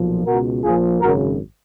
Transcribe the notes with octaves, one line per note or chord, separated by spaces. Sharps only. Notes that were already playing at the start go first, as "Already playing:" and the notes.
Already playing: B1 A#2 F3
C#2 B2 F#4 A#4
A#1 A#2 F3 F4 G#4
G#1 F#2 C#3 F#4 A#4